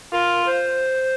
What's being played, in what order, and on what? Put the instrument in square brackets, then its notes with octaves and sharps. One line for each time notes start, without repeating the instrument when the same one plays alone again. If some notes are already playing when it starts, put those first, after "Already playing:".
[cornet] F4 [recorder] A#4
[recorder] C5